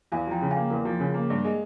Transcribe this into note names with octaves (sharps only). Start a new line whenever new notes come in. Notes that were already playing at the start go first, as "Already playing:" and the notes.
E2 F5 G#5
F3 G5 A#5
C#3
F5 G#5
A#3
E2 A#4
F3
C#3
A#3
G2
G#3